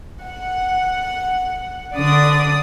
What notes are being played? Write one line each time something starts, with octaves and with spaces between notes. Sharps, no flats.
F#5
D3 D5 D#6